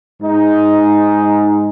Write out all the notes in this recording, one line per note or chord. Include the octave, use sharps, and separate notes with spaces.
G#2 G#3 D#4